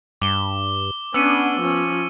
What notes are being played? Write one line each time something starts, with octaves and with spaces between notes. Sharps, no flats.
G2 D6 G7
B3 C#4 D4 E6 C#7 D#7
F3 C#4